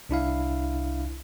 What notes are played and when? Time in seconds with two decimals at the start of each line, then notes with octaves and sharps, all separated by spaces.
0.09 C2 D4 E4 F5